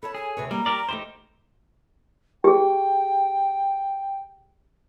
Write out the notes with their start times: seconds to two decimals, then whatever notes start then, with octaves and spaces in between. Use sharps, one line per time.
0.03 A4 C#5 A5 B5
0.15 G#4 G#5
0.37 D2 C3 B4 C#5
0.51 G3 A#3 A#5
0.66 G4 A#4 D5
0.89 E2 A3 D#4 G4 C5
2.44 G4 G#4 G5